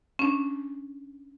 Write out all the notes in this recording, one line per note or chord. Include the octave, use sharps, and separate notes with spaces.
C#4 D4